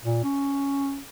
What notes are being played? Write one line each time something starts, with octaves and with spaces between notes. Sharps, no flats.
A#2
C#4